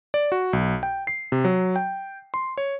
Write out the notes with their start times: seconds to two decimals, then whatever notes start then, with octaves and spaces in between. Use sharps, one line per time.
0.14 D5
0.32 F#4
0.53 B1
0.83 G5
1.07 C7
1.32 C3
1.45 F#3
1.76 G5
2.34 C6
2.58 C#5